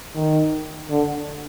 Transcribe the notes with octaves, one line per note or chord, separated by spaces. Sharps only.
D#3
D3